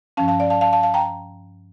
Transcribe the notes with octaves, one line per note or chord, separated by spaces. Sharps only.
G2 F3 C#4 F5 A5
F5 A5
D5 F5
F5 A5
F5 A5
F5 A5
F5 A5
G5 A#5